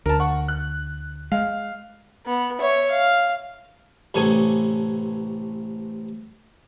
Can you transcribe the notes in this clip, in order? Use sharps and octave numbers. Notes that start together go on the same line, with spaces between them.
D2 A#4 A5
F#5 C#6
F#6
G#3 F5
B3
C#5 E5
F5
A1 C3 C#4 A4 G#5 D#6